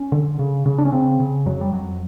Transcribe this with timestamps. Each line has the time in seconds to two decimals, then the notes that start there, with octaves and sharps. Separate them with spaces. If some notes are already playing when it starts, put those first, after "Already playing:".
Already playing: C#4
0.12 D3
0.39 C#3
0.66 C#3
0.78 D4
0.85 C#4
0.92 C#3 C4
1.20 C#3
1.46 F2 F#3
1.61 G3
1.72 F2 F#3